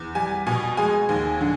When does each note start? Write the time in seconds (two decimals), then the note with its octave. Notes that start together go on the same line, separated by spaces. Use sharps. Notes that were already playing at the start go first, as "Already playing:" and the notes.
Already playing: E2
0.15 G3 G#5
0.47 B2 G#5
0.77 G#3 G#5
1.09 D#2
1.41 D3